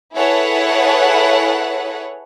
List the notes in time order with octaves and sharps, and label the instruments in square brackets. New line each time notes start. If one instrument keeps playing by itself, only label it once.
[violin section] E4 G#4 A4 B4 C#5 F#5